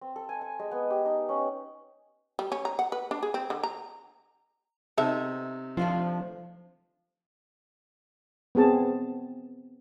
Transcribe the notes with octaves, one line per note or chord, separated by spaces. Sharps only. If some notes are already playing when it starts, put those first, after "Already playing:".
C4
A4
G#5
G#5
G#3
B3
G4
D#4
C#4
G3
C#4
A#5
F#5
B4
D4
G#4
C4
D3
A#5
C3 B3 D#4 A4 E5
F3 A3 D4 F4
B3 C4 G#4 A5